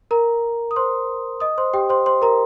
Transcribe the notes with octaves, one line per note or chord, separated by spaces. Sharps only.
A#4 A#5
D#6
C5 C6
D#5 D#6
C5 C6
G4 G5
C5 C6
C5 C6
A#4 A#5